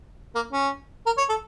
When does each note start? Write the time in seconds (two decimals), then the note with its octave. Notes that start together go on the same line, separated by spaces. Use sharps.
0.35 A#3
0.53 C#4
1.06 A#4
1.18 C#5
1.29 A4